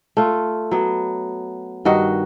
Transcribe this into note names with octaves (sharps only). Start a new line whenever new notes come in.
A3 F4
F#3 B3
G2 D#3 F#4 D#5